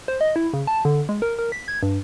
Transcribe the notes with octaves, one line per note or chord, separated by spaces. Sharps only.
C5
D#5
E4
C#3
A5
D3
G#3
A#4
A#4
B6
G#6
G2